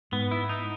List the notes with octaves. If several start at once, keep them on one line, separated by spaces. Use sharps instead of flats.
G#2 B3
E4
D#4